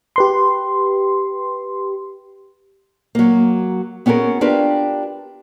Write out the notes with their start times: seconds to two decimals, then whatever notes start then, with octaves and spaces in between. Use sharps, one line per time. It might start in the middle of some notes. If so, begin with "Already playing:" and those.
0.16 G4 B4 C6
3.15 F#3 A#3
4.06 B3 C#4 F#4 G#4 A#4
4.41 D4 F4 G4 A#4 B4